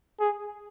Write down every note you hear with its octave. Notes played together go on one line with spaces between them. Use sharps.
G#4